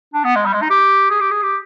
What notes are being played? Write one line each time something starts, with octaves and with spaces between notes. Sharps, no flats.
D4
B3
G#3
G3
G#3
D#4
G4
G#4
G4
G#4
G4